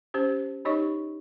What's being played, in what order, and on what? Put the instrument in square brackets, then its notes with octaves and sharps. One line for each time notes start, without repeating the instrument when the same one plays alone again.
[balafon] C#4 G4 C5
D#4 G4 C#5 D#5 C#6